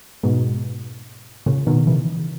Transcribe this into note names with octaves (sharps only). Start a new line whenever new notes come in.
G#2 B2
A#2 C#3
B2 D#3
C#3 E3